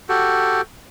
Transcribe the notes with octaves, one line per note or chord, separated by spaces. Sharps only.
F#4 G4 A4